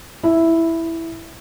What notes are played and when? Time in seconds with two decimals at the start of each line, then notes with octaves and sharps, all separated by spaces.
0.23 E4